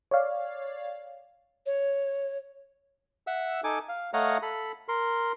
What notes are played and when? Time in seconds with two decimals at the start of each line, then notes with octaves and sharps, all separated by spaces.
0.11 C#5 D5 F5
1.66 C#5
3.27 E5 F#5 E6
3.64 D#4 A4 G#5 D6
3.89 F5
4.13 A3 C#5 D#5 F5 F#5 A#5
4.42 A4 B5
4.88 A#4 C6